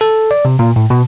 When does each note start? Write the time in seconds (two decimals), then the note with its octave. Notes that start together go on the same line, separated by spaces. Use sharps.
0.01 A4
0.31 D5
0.45 C3
0.59 A#2
0.76 A2
0.90 B2